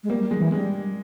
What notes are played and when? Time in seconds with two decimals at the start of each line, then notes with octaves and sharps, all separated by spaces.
0.04 G#3
0.09 G3 A#3
0.24 G3
0.31 G#3
0.39 E3
0.52 G3 G#3